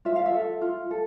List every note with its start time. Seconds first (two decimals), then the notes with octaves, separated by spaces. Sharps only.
0.05 F4 E5
0.16 F5
0.26 E5
0.34 A4
0.61 F4
0.91 A4